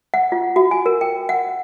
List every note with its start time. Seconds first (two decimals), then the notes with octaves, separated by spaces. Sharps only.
0.14 F#5
0.32 F4
0.56 F#4
0.71 G#5
0.86 A#4
1.01 G5
1.29 F#5